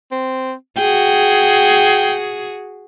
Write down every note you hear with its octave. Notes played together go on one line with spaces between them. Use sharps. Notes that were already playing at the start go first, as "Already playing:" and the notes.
C4
F#4 G#4 G5